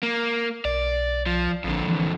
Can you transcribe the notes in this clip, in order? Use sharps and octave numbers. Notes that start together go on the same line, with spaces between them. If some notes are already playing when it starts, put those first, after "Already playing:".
A#3
B1 D5
F3
A1 F2 D3
E3